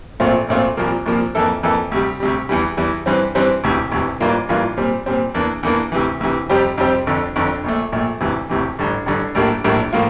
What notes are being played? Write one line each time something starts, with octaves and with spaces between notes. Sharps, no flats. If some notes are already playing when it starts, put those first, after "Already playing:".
A#1 A#2 A3 C4 F4
A#1 A#2 A3 C4 F4
C2 A#2 F3 A#3
C2 A#2 F3 A#3
F2 E3 A#3 E4 A4
F2 E3 A#3 E4 A4
D2 C3 G3
D2 C3 G3
E2 E3 G3
E2 E3 G3
G2 E3 G3 C4
G2 E3 G3 C4
E1 D2 C3 E3
E1 D2 C3 E3
A1 G2 E3 A#3 F4
A1 G2 E3 A#3 F4
A#2 G3 C4
A#2 G3 C4
E2 E3 A#3 D4
E2 E3 A#3 D4
D2 C3 E3
D2 C3 E3
F2 C3 G3 C4 G4
F2 C3 G3 C4 G4
G1 F2 D3
G1 F2 D3
A#1 A#2 A3
A#1 A#2 A3
E1 D2 C3 E3
E1 D2 C3 E3
A1 G2 D3
A1 G2 D3
A#1 A2 G3 A#3 D4
A#1 A2 G3 A#3 D4
A2 F3 A#3 F4